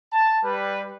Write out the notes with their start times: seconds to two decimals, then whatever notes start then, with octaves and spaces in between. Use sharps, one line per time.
0.12 A5
0.43 G3 B4